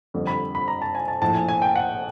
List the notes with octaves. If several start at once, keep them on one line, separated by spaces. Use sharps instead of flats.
F2 D3 G3
B5
B5
A#5
A5
G#5
A5
A#1 A2 F3 A5
G#5
G#5
G5
F#5